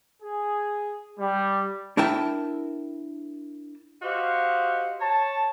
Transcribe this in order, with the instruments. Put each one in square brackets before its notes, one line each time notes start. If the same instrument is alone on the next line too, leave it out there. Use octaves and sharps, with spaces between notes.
[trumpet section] G#4
G3
[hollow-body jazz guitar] D4 E4 A#4 G5 A5
[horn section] F#4 G4 C5 D#5 F5
C#5 A5